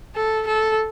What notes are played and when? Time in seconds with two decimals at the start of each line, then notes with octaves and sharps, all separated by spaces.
0.15 A4
0.47 A4